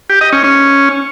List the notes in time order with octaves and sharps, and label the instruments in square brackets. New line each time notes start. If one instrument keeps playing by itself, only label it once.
[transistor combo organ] G4
D#5
C#4
C#4